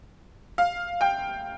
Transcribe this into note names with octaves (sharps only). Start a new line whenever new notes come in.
F5
G5